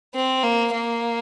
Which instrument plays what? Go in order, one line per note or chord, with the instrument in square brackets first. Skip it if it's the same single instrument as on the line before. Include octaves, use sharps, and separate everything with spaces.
[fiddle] C4
A#3
A#3